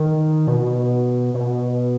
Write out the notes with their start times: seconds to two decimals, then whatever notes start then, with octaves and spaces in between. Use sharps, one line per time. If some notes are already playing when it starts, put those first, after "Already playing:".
Already playing: D#3
0.47 B2
1.34 B2